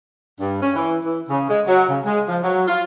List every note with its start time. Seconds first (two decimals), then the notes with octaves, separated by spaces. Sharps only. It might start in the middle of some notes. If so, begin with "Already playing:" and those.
0.40 G2
0.61 C#4
0.76 E3
1.04 E3
1.29 C#3
1.49 G#3
1.67 F#3
1.89 C#3
2.05 G#3
2.28 F3
2.43 F#3
2.68 F4